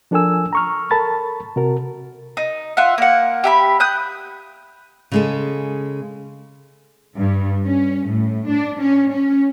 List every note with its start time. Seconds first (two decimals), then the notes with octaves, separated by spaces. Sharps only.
0.11 F3 D4 A4 A#4 G#5 E6
0.53 A#5 C#6 F6
0.91 A4 A#4 A5 B5 A6
1.56 C3 F#4 A#4
2.37 D#4
2.77 F4 E5 F#5
2.98 A#3 F#5
3.44 G4 E5 B5
3.80 D#6 F#6 G6
5.12 C#3 G#3 A4
7.18 G2
7.64 C#4
8.07 A2
8.47 D4
8.81 C#4
9.11 C#4